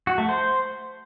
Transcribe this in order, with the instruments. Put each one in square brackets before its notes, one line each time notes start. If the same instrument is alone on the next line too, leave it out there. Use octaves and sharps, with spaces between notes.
[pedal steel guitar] F#4
A3
C5